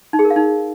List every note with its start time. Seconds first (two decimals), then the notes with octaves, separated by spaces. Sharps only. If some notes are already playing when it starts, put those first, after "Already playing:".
0.13 D#4
0.19 G#4
0.25 A#4
0.30 F5
0.36 D#4